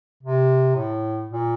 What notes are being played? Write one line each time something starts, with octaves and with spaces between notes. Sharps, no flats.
C3
A2
A#2